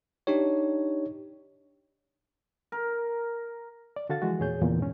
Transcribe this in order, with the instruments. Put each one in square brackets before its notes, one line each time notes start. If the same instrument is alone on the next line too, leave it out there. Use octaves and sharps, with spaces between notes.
[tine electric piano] D4 D#4 G4 C#5
[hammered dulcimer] A#4
[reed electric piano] D5
D3 F#4 A4 F5 A6
E3 F3 G#3 F#4
E2 A#2 G#4 C#5 G6
E2 A#2 C#3
G#2 C#4